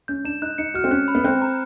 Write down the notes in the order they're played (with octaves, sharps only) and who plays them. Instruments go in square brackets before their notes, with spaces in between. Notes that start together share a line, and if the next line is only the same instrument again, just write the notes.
[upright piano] C#4 [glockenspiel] G6
[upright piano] D4 [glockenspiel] E7
[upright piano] D#4 [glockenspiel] F#6
[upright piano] D#4 [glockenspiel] C#7
[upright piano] F#4 [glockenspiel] F6
[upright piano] C4
[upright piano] C#4 [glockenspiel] F#6
[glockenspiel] B5
[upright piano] B3
[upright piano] C4 [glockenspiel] F#6
[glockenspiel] A#5